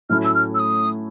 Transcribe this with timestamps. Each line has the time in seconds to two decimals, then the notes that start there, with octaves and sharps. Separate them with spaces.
0.10 A2 F#3 A3 C#4 E4 F6
0.25 E6
0.35 F6
0.54 E6
0.59 D#6